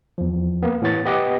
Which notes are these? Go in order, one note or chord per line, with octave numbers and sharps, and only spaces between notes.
E2 F3
A#3 B3
A2 E3 B3 C#5 A6
B3 G4 D#5 F#5 D6